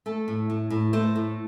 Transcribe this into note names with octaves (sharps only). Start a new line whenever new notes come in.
A3 A4
A2
A2
A2
A3 C5
A2